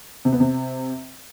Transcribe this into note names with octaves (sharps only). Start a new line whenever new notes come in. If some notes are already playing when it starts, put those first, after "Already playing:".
C3
B3
C3